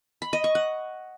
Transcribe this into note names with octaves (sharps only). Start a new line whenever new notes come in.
B5
D#5
C#6
F#5